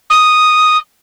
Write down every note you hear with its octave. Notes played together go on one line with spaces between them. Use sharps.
D#6